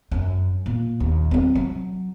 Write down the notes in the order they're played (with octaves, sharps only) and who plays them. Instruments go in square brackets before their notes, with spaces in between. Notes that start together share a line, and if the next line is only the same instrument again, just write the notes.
[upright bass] F#2
A#2
D#2
F#3 C4
F#3